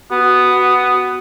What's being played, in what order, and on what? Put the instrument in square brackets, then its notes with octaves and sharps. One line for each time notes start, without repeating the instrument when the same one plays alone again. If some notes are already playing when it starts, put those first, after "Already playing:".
[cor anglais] B3 [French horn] F#4